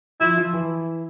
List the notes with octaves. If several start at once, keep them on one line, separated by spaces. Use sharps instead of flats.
F3 E4 F4
F3 F4
E3 E4